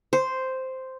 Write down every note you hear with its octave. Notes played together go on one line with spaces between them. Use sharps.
C5